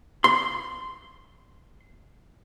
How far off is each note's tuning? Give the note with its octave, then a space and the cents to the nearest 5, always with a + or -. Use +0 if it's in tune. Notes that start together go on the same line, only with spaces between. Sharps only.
C6 -15